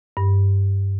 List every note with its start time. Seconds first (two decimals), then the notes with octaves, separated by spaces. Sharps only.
0.17 G2